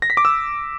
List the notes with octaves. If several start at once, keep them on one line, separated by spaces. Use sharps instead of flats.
A#6
B6
D6
E6